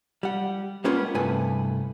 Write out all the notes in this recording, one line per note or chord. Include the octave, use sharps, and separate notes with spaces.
G3 F#5
G3 G#3 A#3 B3 C#4 F4
C2 G2 A3 B4 G#5